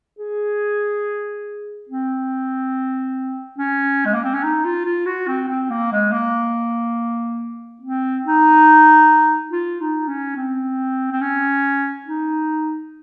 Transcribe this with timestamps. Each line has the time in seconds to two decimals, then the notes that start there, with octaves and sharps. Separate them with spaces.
0.19 G#4
1.89 C4
3.58 C#4
4.06 G#3
4.14 A#3
4.24 C4
4.33 C#4
4.43 D#4
4.65 F4
4.85 F4
5.06 F#4
5.27 C4
5.48 C4
5.70 A#3
5.92 G#3
6.12 A#3
7.82 C4
8.25 D#4
9.51 F4
9.80 D#4
10.08 C#4
10.36 C4
11.11 C4
11.21 C#4
12.06 D#4